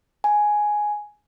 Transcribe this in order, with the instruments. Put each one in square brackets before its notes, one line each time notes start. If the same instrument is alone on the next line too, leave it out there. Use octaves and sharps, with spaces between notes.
[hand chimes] G#5